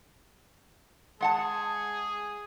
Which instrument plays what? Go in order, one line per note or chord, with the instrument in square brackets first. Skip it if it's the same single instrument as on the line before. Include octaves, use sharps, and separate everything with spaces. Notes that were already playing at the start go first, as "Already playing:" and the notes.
[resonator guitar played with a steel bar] G#3 F#5 A5 [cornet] G#4